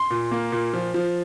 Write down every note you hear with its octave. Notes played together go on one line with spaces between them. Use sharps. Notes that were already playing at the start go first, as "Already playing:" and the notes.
Already playing: C6
A#2
A#3
A#2
F3
F3